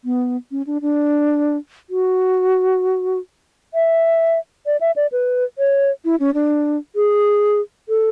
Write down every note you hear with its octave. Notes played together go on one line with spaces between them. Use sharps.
B3
C#4
D4
D4
F#4
E5
D5
E5
D5
B4
C#5
E4
C#4
D4
G#4
A4